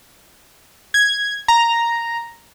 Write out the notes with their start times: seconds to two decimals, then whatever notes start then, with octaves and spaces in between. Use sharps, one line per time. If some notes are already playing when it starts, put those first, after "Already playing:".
0.94 G#6
1.48 A#5